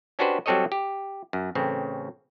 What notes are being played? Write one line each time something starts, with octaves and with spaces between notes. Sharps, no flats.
C#4 D4 F#4 G4 B4 C5
F#3 G3 C4 A4 C#5 D#5
G4
F#2
A1 C#3 C4